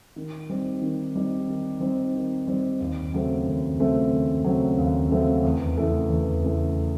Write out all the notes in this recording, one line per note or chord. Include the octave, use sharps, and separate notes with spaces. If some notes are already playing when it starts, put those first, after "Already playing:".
D#3
G3 C4 D#4
D#3
G3 C4 D#4
D#3
G3 C4 D#4
D#3
G3 C4 D#4
D#2
C#3 F#3 A3 C4
D#2
C#3 F#3 A3 C4
D#2
C#3 F#3 A3 C4
D#2
C#3 F#3 A3 C4
E2
C#3 E3 A3
E2
C#3 E3 A3